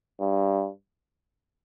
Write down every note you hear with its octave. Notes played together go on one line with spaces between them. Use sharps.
G2